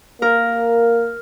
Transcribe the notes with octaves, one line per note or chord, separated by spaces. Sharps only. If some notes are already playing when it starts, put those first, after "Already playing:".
A#3 A#4